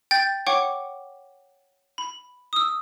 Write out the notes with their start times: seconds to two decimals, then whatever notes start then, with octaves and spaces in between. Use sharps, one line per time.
0.11 G5 G6 A6
0.47 C#5 F#5 G5 C#6 D6
1.98 B5
2.53 D#6 E6